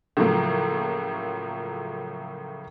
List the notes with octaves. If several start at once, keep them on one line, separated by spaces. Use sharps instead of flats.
A2 C#3 F3 F#3 A3 A#3